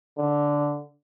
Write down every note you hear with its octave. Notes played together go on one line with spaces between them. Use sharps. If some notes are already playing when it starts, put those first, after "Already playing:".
D3